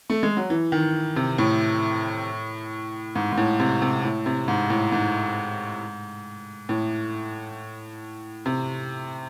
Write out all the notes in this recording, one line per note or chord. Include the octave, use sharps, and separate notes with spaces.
A3
G#3
F#3
E3
D#3
C3
A2
G#2
G#2
A2
C3
C3
A2
C3
G#2
A2
G#2
A2
C3